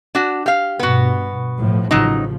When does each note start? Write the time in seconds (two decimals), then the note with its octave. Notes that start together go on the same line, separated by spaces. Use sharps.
0.15 D4 F#4
0.46 G4 F5
0.79 G2 B2 B3 F#4
1.59 A2 F3
1.91 A1 C#3 F3 F#3 D#4